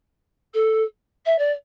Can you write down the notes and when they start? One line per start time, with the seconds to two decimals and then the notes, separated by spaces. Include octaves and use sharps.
0.54 A4
1.25 E5
1.38 D5